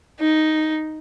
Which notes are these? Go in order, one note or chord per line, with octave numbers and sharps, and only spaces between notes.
D#4